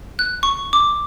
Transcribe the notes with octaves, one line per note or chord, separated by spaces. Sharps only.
F#6
C#6
D6